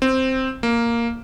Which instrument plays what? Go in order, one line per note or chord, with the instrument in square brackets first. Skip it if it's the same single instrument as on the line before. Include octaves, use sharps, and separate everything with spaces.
[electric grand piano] C4
A#3